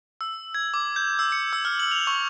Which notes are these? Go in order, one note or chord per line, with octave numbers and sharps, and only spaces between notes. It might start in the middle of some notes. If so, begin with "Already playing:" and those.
E6
G#6
D6
G6
E6
C#7
E6
F6
F#7
F7
C#6